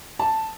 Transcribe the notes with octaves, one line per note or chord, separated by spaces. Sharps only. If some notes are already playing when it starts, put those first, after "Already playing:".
A5